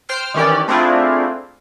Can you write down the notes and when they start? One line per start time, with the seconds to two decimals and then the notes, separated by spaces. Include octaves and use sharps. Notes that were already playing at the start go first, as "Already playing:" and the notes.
0.09 C5 G5 F6 C7
0.34 D#3 E3 C#4 G4 D5
0.68 A3 C4 D4 E4 F4 G#4